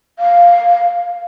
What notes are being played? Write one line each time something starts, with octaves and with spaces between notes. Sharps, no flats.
F5